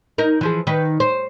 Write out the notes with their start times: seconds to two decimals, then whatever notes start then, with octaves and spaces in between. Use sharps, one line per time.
0.18 D#4 A#4
0.41 E3 F3 G#4
0.67 D#3 B4
1.00 C5